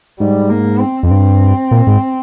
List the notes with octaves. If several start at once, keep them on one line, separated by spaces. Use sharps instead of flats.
G#2 G3
A#3
C4
F2
G2 C4
A#2
G#2